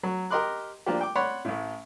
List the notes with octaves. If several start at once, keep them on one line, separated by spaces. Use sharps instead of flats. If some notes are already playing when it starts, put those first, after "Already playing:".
F#3
G4 A#4 D#5 C6 D6 F#6
F3 A#3 D4 F4 G4
G5 D6
C#5 D5 F#5 B5 C6
A1 A2